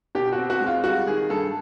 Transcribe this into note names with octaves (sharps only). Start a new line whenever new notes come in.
B2 G4
F#4
C4
F#4
G#3
F4
G3 F#4
D#3 G#4
G2 A4